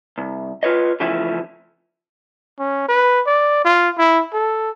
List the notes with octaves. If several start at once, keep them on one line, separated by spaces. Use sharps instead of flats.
C2
F4 B4 C#5 D#5
C#3 E3 F3 A3 C#4 E4
C#4
B4
D5
F4
E4
A4